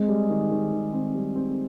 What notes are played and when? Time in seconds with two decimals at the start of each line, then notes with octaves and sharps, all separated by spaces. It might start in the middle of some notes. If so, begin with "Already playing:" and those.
Already playing: G#3 C4
0.09 G3
0.30 D#3
0.51 D#3
0.72 D#3
0.93 C4
1.15 G3
1.35 C4